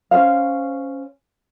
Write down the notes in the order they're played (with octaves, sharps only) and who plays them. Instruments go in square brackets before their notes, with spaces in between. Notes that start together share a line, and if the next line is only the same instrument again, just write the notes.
[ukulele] C#4 C5 F5